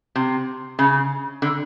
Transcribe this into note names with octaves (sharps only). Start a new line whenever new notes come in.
C3
C#3
D3